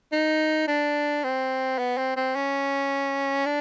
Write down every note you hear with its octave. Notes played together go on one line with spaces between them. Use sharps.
D#4
D4
C4
B3
C4
C4
C#4
D4